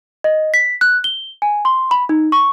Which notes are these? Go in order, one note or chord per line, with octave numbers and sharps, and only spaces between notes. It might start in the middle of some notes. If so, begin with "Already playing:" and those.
D#5
B6
F#6
G7
G#5
C6
B5
D#4
C#6